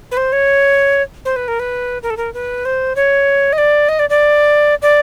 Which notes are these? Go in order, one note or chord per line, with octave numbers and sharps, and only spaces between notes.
B4
C5
C#5
C5
B4
A#4
B4
A#4
A4
A#4
B4
C5
C#5
D#5
D5
D#5
D5
D5
D5